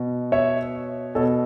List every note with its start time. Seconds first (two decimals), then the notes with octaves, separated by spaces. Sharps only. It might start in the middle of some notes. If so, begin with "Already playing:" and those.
Already playing: B2
0.32 C#5 E5
1.15 B2 A4 C#5